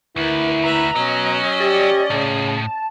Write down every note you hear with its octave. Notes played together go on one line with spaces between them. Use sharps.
D2 E4 A#4 B4
B4 E5 A#5
B2 F#3 C#4 D#5
G4 D5
A2 C#3
A5